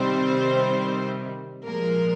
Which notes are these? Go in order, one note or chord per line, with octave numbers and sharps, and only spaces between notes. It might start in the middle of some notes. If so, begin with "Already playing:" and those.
Already playing: C3 D#3 G3 C4 C5
A#2 F3 G#3 A#3 A#4